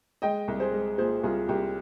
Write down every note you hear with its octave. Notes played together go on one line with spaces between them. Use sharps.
G#3 D#5 G5
C2
G#4 C5
G#3
A#2 G#4 C5
C2 F4 G#4
C2 G4